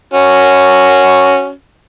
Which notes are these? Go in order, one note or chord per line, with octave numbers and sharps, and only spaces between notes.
C#4 F#4